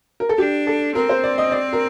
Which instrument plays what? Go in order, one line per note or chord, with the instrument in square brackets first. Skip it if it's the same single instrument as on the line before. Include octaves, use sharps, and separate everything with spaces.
[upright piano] A#4
A4
[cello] D4 [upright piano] G4
[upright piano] A4
[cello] C4 [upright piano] A#4
[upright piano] C5
D5
D#5
D5
A#4